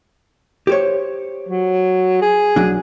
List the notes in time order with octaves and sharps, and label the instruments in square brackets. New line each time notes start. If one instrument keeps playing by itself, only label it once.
[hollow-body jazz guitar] G4 C5 C#5
[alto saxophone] F#3
G#4
[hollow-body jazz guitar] B1 F#3 D4